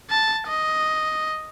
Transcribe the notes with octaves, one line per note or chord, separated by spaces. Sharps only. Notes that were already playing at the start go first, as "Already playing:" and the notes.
A5
D#5